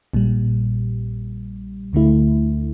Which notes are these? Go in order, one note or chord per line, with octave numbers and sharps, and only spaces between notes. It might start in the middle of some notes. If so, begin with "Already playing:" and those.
A#1 A#2 G3
D2 D3 A3 E4